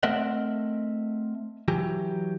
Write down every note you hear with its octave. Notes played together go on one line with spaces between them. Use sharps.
A3 C4 A#4 D#5 E5 F#5
E3 F#3 G4